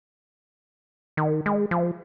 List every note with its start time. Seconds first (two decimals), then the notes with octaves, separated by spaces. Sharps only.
1.17 D#3
1.46 G#3
1.71 F3